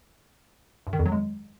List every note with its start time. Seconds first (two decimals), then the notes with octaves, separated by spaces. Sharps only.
0.87 G2
0.93 D#3
0.99 F2
1.06 F#3
1.12 G#3